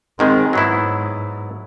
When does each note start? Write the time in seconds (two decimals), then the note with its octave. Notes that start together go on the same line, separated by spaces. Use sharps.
0.19 G#2 D#3 G#3 C4
0.53 G#2 F#3 B3 E4